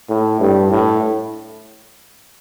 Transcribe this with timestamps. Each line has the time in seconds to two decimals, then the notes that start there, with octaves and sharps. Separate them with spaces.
0.10 A2
0.40 G2
0.71 A2